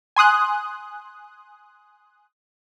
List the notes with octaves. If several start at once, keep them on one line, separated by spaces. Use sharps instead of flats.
G#5 C6 D#6 F#6